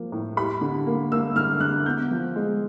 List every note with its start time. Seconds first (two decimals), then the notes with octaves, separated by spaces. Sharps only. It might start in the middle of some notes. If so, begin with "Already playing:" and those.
Already playing: F3 A#3
0.12 A2
0.37 G3 B5
0.61 D3
0.86 A#3
1.11 A#3 E6
1.36 D3 F6
1.60 D3 F#6
1.86 B3 G6
2.11 F3
2.36 G#3